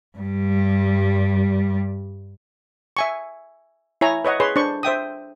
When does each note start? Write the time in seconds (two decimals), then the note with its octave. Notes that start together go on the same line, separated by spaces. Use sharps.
0.18 G2 G3
2.97 E5 G#5 C#6
4.01 E4 C#5 G#5 A#5
4.25 B4 C#5 D#5 F#5
4.40 G#4 B4 C#5 C6
4.56 D4 C5 C#6
4.83 C5 E5 G5 D#6